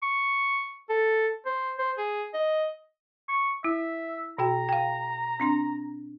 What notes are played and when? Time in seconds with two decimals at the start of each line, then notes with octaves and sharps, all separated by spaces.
0.02 C#6
0.89 A4
1.46 C5
1.79 C5
1.98 G#4
2.34 D#5
3.29 C#6
3.64 E4 E5
4.38 B2 F#4 G5 A#5
4.69 F5 G5
5.40 C4 D4 C6